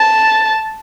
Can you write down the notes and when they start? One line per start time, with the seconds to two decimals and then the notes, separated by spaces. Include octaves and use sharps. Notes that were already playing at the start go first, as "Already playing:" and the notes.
Already playing: A5